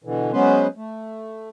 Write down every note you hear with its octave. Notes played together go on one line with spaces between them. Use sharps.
B2 D3 E3
F#3 G#3 B3 C#4 B4 C5
A3